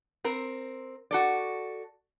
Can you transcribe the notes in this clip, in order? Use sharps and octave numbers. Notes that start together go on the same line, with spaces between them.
C4 A#4
F#4 A4 D5